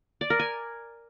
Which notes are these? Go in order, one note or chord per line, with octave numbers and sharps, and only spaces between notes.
D5
A#4
G#5